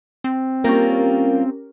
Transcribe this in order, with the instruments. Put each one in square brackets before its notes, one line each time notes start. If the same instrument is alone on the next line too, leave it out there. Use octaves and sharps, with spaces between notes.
[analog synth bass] C4
[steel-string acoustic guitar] G3 A#3 F4 [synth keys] C#4 G4 A#4